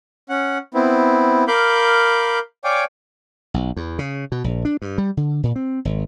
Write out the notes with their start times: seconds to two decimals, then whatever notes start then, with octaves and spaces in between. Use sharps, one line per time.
0.29 C#4 F#5
0.74 B3 C4 E4
1.48 A#4 F5 B5 D6 G6
2.64 C#5 D5 F5 G5 G#5 D6
3.54 B1
3.77 E2
3.99 C#3
4.32 B2
4.44 A#1
4.65 D4
4.82 G2
4.98 G3
5.17 D3
5.43 A#2
5.56 C4
5.85 G#1